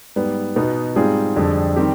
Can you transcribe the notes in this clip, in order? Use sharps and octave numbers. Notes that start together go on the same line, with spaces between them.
G#2 G3 B3
B2 B3 D#4 B4
G#2 G3 C4 F4 G#4
F2 D3 G3 D4 G#4
D#3 G3 C4 G4